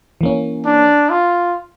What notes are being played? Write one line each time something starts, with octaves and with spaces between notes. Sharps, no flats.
E3 A#3 C#4
D4
F4